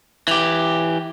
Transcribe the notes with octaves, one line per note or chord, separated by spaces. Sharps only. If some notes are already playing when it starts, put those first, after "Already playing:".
E3 G4